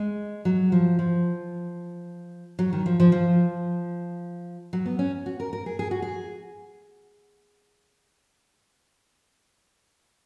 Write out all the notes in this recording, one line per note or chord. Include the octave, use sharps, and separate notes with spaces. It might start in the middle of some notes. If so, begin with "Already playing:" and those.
Already playing: G#3
F#3
F3
F3
F#3
D#3
F3
F3
F3
F#3
B3
C#4
F#4
A#4
A#4
G#4
G#4
F#4
G#4